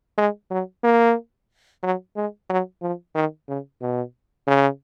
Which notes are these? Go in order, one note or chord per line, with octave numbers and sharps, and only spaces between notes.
G#3
F#3
A#3
F#3
G#3
F#3
F3
D#3
C#3
B2
C#3